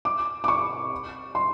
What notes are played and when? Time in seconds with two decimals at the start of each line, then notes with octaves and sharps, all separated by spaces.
0.05 D6
0.44 D6
0.48 C#6
1.35 C6